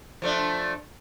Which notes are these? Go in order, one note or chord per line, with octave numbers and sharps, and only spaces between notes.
F3 A3 D4